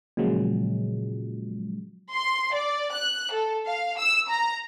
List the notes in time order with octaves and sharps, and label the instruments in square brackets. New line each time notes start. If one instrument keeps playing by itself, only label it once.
[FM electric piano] A#2 C#3 F3 F#3 G#3
[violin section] C6
D5
F#6
A4
F5
E6
A#5